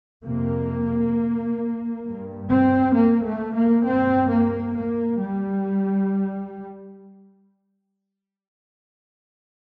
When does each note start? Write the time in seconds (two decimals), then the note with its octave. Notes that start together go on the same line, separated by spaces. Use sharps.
0.23 F2 C3 A#3
2.05 G2
2.50 C4
2.95 A#3
3.25 A3
3.55 A#3
3.85 G2 C4
4.30 A#3
4.76 A#3
5.20 G3